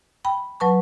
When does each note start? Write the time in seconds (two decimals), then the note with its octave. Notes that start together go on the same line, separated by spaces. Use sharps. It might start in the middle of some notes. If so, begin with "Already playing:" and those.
0.25 G5 B5
0.60 F#3 B4 A5 C#6